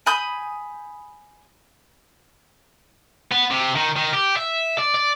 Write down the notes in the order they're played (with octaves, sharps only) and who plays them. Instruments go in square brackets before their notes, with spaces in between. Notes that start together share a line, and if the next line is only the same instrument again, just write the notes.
[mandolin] G#5 B5 D#6 G6
[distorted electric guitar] B3
C3
D#3
D#3
G4
E5
D5
D5